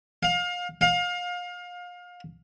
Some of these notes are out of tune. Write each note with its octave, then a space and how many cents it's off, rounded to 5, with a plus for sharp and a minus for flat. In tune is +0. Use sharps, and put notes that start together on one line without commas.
F5 +30
F5 +30